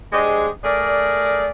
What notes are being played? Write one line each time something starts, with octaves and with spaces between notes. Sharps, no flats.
G#3 D4 G4 G#4 C5 D#5
A3 G#4 A#4 D5